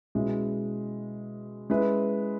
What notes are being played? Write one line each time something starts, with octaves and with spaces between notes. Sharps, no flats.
B2 G#3 C#4 E4
G#3 C#4 E4 B4